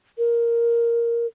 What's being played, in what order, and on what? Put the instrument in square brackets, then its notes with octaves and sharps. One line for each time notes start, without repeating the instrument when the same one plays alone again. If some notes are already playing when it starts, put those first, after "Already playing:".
[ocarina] A#4